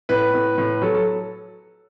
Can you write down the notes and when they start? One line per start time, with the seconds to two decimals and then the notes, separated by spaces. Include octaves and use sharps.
0.09 A2 B4
0.34 A2
0.58 A2
0.82 F#3 A4
0.94 A4